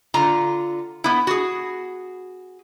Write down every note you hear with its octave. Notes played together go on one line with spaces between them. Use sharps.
D3 F4 A#5
B3 E4
F#4 G#4